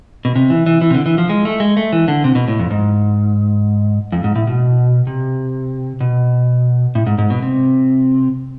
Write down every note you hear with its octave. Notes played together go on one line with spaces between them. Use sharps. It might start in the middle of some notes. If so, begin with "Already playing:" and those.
B2
C3
E3
E3
E3
C3
D3
E3
F3
G#3
A3
G#3
A3
E3
D3
C3
B2
A2
F2
G#2
F2
G#2
A2
B2
C3
B2
A2
G#2
G#2
B2
C3